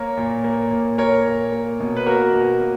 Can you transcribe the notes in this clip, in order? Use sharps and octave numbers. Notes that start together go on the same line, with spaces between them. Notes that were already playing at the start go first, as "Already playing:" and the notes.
Already playing: A#3 A#4 C#5
A#2
A#3
A#2
A#3 A#4 C#5
A#2
A#3
B2
B4
A#3 F#4 A#4
B2
A#3